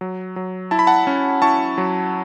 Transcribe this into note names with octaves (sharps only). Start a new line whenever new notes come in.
F#3
F#3
E4 A5
B5
F#5 A5
C#4
E4 A5 C#6
F#3